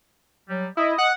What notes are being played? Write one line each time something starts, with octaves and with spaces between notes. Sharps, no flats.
F#3 G3
E4 D#5
F#5